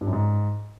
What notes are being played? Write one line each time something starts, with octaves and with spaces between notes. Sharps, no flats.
G2
F#2
G#2